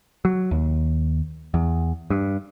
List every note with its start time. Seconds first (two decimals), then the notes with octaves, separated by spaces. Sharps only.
0.25 F#3
0.51 D#2
1.54 E2
2.10 G2